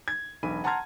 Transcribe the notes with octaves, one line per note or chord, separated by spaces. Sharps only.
G#6
E1 B1 B5 D#7
F#5 A5 A#5 C6 F6 G#6